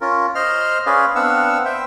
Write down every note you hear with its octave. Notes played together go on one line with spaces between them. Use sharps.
C#4 F4 A#4
C5 D#5 C6 F6
C#4 G#4 B4 D5 F5 C6
B3 C4 D4 F5 F#5 E6
C5 E5 G5